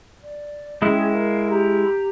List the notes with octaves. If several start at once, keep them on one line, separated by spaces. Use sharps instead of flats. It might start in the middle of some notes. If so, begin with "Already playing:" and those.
D5
G#3 C#4 E4 G#4 G5
A#4 F5
G4 A#5